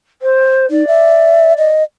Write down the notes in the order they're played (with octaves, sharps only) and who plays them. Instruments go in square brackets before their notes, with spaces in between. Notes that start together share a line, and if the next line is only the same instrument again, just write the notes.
[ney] C5
[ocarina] D#4 [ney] D5
[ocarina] E5
D#5